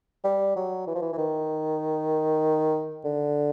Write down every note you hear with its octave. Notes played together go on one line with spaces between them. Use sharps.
G3
F#3
E3
F3
E3
E3
D#3
D3